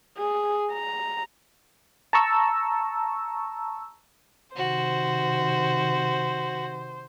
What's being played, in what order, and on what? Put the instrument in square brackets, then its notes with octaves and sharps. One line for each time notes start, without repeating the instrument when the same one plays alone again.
[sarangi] G#4
A#5
[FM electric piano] A5 A#5 C#6 E6
[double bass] C3 D#3 [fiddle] F#4 [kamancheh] C5